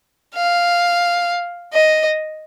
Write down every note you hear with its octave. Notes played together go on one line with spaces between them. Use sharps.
F5
D#5